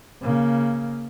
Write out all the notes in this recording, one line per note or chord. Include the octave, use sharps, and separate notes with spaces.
C#3 A#3